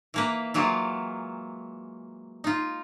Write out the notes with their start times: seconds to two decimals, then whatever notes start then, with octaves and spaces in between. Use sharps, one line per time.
0.14 E3 A#3 B4
0.54 E3 F#3 G#3 A#3 F4
2.44 D#4 F4